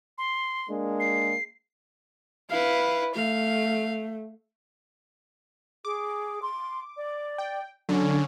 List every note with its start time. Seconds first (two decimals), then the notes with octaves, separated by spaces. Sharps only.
0.18 C6
0.70 G#3 A#3 D4
1.00 C7
2.50 E4 B4 F5
3.15 A3 F5
5.85 G#4 D6
6.42 C6
6.96 D5
7.38 G5
7.89 D3 F#3 C#4